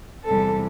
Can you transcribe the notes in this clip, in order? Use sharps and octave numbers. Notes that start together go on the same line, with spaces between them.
E2 C3 E3 G3 A4